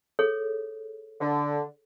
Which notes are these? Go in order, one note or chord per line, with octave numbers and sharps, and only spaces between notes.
G#4 A4 C#5
D3